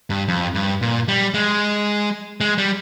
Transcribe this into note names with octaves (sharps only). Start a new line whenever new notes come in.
G2
F2
G2
A#2
G3
G#3
G#3
G3